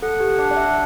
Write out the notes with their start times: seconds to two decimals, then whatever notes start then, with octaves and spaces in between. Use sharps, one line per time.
0.02 A4 F#5
0.20 G4
0.38 D4
0.51 D5
0.57 E5